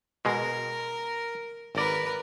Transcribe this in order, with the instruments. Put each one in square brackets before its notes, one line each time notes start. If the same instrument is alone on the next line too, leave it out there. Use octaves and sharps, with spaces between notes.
[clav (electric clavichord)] B2 G#3 [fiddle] A#4
[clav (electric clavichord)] G#1 D5 [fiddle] A#4 B4